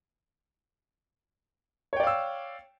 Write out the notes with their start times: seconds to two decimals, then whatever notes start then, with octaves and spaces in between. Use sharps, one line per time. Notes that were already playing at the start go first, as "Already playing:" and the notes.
1.93 C#5
1.96 G5
2.00 D5
2.03 F5
2.07 E6